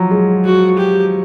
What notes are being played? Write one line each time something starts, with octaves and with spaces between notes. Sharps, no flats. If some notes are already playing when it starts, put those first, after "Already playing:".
Already playing: F3 F#3
G#3
F#4
G4